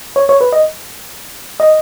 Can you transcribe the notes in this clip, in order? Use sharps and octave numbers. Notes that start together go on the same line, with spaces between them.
C#5
C#5
B4
D#5
D#5